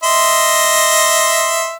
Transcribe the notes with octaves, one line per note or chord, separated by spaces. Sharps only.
D#5 E5 C6